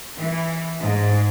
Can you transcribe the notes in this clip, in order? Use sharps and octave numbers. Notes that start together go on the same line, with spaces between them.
E3
G#2